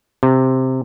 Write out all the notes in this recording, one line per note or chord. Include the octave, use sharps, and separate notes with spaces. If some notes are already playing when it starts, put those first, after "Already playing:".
C3